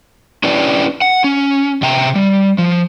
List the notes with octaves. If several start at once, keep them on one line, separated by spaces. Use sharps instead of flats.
C#4 D4 E4 G4 B4 D5
F#5
C#4
C3 E5 G5 A#5
G3
F3